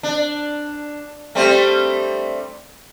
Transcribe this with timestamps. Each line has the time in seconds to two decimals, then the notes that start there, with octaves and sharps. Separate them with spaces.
0.03 D4
1.35 G3 A3 C4